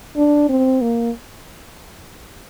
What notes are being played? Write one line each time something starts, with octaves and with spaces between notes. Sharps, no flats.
D4
C4
A#3